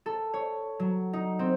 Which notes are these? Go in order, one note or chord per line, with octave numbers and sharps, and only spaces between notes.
A4
C#5
F#3
D#4
C4